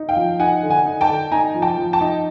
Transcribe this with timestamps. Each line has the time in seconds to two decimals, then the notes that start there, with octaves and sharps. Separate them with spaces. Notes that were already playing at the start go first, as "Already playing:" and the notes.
Already playing: D#4
0.09 F5 G5
0.16 F3
0.39 D#4 F#5 G#5
0.63 D3
0.70 F#5 G#5
0.86 D#4
1.01 G5 A5
1.09 D3
1.32 D#4 G#5 A#5
1.54 F3
1.62 G5 A5
1.78 F3
1.93 G5 A5
2.01 D#4